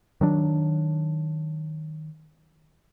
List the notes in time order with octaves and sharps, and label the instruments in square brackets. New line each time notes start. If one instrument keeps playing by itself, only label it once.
[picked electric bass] D#3 F#3 D4